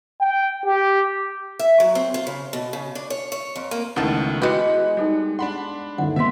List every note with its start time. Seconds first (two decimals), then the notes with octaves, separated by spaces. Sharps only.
0.21 G5
0.66 G4
1.59 E5
1.80 F#3
1.95 C4
2.14 F4
2.27 C#3
2.53 B2
2.73 C#3
2.95 D4
3.10 C#5
3.32 C#5
3.56 F2
3.71 A#3
3.96 C#2 D#3 E3 A3 B3 D5 A5
4.42 G#3 E4 F#4 G4 B4 B5 F#6 C#7
4.97 G3 D#4 A4 D5
5.39 D4 F#5 B5 C6
5.98 G1 D#2 D3 F#5
6.16 C3 B3 D#5 E5 C6 B6